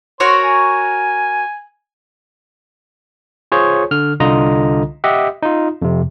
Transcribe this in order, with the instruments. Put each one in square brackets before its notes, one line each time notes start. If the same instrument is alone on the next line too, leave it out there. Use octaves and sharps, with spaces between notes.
[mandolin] F#4 A#4 C#5 [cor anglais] C5
[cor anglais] G#5
[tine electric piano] F4 G#4 C5 C#5
D3 F6
C2 D3 F4 D#5 A#5
G4 D#5 E5 F#5
D#4 F4
F2 C3